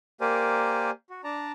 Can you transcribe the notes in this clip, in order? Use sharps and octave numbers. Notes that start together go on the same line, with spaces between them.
A#3 G4 A#4 C5 D5 G#5
F#4
D4 D5 A5 A#5